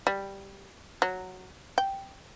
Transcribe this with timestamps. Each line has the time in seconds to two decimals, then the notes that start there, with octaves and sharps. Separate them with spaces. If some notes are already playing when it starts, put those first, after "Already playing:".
0.07 G3
1.02 F#3
1.78 G5